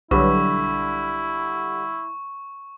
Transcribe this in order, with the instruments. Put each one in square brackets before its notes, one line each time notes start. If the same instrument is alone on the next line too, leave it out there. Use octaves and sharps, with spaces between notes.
[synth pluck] B1 [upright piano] D3 G3 [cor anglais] E4 [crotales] C#6